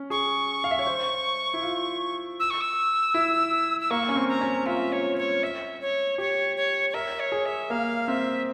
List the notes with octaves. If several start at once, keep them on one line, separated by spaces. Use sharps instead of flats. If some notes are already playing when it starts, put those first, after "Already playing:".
Already playing: C#4
G#4 C#6
F5
E5
C#5
C5
E4
F4
E6
C#6
E6
E4
E6
A#3 C#6
C#4
C4
A#5
C#4
F4 E5
C#5
C#5
E5
C#5
G4 C#5
C#5
C#5
A#4 E5
C#5
G#4
E5
A#3 F5
C4 E5